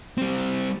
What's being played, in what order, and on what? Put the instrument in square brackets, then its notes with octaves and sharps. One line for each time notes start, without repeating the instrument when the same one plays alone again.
[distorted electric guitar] G3 C4